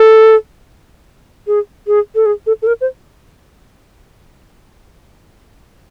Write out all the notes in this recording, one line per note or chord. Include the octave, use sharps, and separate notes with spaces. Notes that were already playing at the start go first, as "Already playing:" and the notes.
Already playing: A4
G#4
G#4
A4
G#4
A4
A4
A#4
C5